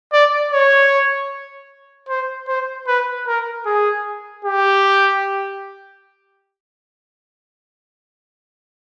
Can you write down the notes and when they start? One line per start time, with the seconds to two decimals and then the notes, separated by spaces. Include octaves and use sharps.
0.13 D5
0.52 C#5
2.09 C5
2.48 C5
2.87 B4
3.27 A#4
3.66 G#4
4.45 G4